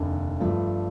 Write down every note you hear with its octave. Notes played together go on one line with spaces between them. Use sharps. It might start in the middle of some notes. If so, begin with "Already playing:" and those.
Already playing: F1 D#2 D3
G2 F3 A3 D4